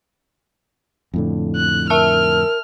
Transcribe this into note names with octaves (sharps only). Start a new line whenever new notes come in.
F2 A2 D3
F#6
A#4 E5 A5 E6 F6